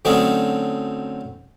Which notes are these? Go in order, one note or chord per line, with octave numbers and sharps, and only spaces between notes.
D3 F#3 A3 C4 C#4 D#4